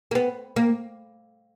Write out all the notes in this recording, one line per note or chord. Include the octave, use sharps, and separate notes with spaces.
A#3
B3
A#3